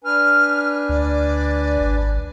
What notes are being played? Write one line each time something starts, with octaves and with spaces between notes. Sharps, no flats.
D4 B4 G#5 F6
D2 D5
G#1